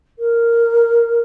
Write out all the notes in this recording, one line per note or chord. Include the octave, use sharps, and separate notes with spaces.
A#4